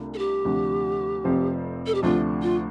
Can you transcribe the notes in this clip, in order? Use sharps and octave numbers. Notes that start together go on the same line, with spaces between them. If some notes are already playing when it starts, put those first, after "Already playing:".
Already playing: C2 C3 A3 D4 F4
A4
G4
D2 C3 F3 D4
F1 F2 C3 F3 C4
A4
G4
D2 C3 F3 A3 D4 F4
F4